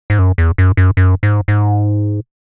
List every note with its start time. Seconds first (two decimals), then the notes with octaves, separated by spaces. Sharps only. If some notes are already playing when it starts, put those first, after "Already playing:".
0.10 G#2
0.19 F#2
0.38 E2
0.58 F#2
0.77 F#2
0.97 F#2
1.23 G#2
1.48 G#2